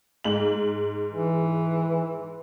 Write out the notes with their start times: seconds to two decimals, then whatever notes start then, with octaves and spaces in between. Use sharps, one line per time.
0.24 G#2 F#7
1.12 E3